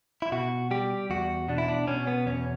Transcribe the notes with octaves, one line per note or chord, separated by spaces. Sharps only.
E4
B2 F#4
G3 G4
E2 F#4
B2 D4
E4
D4
B2 C#4
B3
E2 C#4